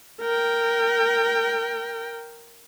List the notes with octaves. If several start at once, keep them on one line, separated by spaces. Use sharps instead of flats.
A#4 G5